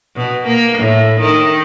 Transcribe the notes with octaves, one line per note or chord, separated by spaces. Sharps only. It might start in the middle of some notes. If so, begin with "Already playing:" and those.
B2
A#3
A2
D#3